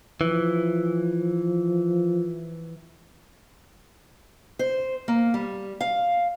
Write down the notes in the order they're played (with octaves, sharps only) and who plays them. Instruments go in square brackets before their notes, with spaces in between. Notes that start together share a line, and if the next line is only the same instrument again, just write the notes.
[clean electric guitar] E3 [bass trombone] F3
[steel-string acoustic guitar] C5
A#3
G3
F5